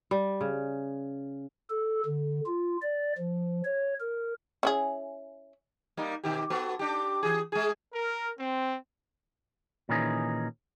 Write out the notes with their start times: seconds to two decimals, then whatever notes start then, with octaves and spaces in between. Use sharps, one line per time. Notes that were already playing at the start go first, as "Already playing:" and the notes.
0.11 G3
0.41 C#3
1.70 A4
2.06 D3
2.46 F4
2.82 D5
3.18 F3
3.64 C#5
4.00 A#4
4.63 C#4 E4 G#4
5.97 G3 A#3 D#4
6.24 B2 D#3 G4
6.50 B3 F#4 A4
6.79 D4 G4
7.23 E3 G#4
7.52 G#3 G#4
7.93 A#4
8.39 C4
9.89 A#2 D#3 E3 C#4 D#4 G#4